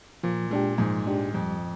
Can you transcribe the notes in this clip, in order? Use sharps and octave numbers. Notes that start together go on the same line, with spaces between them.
A#2 F3
A#2 G#3 D4 G4
G#2 F3
G#3 D4 G4
F2 G3